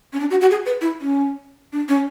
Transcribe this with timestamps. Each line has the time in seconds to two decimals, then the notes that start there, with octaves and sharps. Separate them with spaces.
0.13 C#4
0.20 D4
0.30 F#4
0.41 F#4
0.51 G#4
0.66 B4
0.81 E4
1.01 C#4
1.73 D4
1.89 C#4